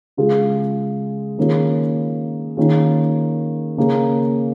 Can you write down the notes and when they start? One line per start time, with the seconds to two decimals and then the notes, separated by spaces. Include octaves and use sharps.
0.17 C#3 G#3 F4 G#4
1.38 D#3 A#3 C#4 F4 G#4
2.57 D#3 A#3 C#4 F4 G#4
3.77 C#3 A#3 C#4 G#4